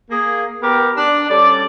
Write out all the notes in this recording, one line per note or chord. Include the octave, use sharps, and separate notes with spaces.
A#3 G#4
B3 G4 A#4
D4
G3 C#4 A4 D5